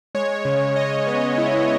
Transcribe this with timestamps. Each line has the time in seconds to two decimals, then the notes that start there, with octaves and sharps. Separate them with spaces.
0.15 G#3 C#5
0.45 C#3
0.76 C#3 D#5
1.07 B3
1.38 E4